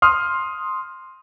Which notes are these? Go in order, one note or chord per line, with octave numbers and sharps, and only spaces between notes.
C6 D#6 F6